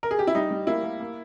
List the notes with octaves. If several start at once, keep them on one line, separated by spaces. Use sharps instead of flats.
A#4
G#4
G4
E4
G3 D#4
G3
A#3 E4
A#3
A#3